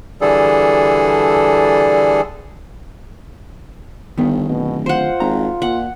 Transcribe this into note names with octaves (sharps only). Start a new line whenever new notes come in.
D3 E3 G3 G#4 A4
G1 D#3 B3
D1 B2
F4 C5 F#5
G#1 A#5
A#2 F#5